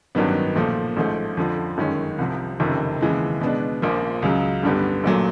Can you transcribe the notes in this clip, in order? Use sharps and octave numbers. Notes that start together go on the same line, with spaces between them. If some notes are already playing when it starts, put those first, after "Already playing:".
A1 G2 D#3 F#3 B3
B1 A#2 F3 A3
A1 G#2 F3 A3
F2 D3 F3
G1 F#2 D#3 G#3 C#4
C2 C3 F3
F#1 F2 C3 D#3
D#2 C#3 E3 G#3
B2 G#3 B3 D4
A#1 A#2 F3 A#3
C#2 C#3 F#3
A1 G2 D3 G3 B3
A#1 A#2 F#3 A3